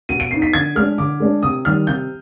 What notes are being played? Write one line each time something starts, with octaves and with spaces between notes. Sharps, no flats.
B2 D#7
D7
B3 D#4 C7
B6
D3 G#6
G#3 D4 F6
D3 D6
G#3 D4
C3 D#6
D#3 G3 F6
C3 G6